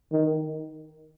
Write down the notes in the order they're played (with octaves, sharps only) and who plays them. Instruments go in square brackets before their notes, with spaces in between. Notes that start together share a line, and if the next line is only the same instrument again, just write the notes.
[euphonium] D#3